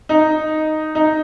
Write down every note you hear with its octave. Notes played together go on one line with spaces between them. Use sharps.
D#4
D#4